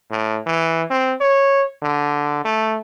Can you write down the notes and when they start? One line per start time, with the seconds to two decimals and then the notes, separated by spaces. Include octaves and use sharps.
0.11 A2
0.46 E3
0.90 C4
1.20 C#5
1.82 D3
2.45 A3